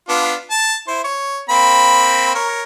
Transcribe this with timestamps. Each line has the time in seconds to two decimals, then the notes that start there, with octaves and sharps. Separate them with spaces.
0.09 B3 D4 F4
0.51 A5
0.88 E4 C5
1.04 C#5
1.49 A#3 C4 B5
2.35 A#4 C#5